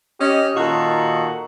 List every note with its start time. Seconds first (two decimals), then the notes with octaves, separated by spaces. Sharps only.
0.20 C#4 G4 D#5
0.56 A#2 D#3 F#4 A4